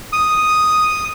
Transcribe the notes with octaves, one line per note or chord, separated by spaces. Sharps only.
D#6